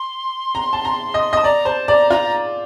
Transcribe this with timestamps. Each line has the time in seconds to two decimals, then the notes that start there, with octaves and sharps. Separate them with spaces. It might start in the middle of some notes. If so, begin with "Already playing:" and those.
Already playing: C6
0.55 A#5
0.73 A5
0.85 A#5
1.14 D#5
1.33 D#5 A5
1.44 D5 A#5
1.65 C5 A5
1.88 D5 A#5
2.10 F4 A#5